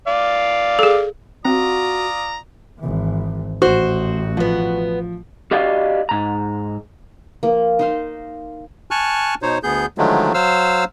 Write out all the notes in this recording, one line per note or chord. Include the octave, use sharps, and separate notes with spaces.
D5 F5
G#4 A4
C4 F4 F#4 D5 A#5 D#6
G#1 E3
A1 F#4 C5
B2 F3 B3
F#4 G4 D5 D#5 F5
G#2 A#5
F3 A#3
D#4 C5 F5
G#5 A5 C#6 F6 F#6
B2 D#4 C5 C#5
D2 B3 G#4 G6
D3 D#3 F3 F#3 G#3 A3
F#3 C5 F5 E6 F6